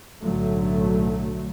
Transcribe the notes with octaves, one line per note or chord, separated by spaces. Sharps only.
B1 A2 D3 F#3 A3